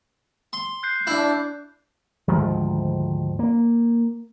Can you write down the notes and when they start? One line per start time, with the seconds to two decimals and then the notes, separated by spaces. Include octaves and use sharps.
0.53 C6
0.83 F#6 G6 C7
1.07 D4 E4
2.28 D2 G#2 D#3 F3
3.39 A#3